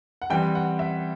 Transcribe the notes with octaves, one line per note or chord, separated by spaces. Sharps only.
F#5
E3 G3 C4 G5
F#5
E5